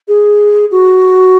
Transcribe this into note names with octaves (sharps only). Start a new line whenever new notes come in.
G#4
F#4